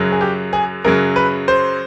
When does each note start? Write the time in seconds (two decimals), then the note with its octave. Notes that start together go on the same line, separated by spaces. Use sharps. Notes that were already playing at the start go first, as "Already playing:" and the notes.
Already playing: F#2 C#3 F#3
0.12 G#4
0.21 G4
0.53 G#4
0.84 F#2 C#3 F#3 A#4
1.16 B4
1.48 C5